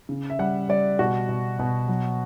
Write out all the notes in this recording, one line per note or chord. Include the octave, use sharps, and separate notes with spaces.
C#3
E5
G3 F#5
G3 D5
B2 F#4
B2
B2
F#3